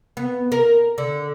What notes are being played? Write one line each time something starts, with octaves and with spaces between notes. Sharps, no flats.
B3
A#4
D3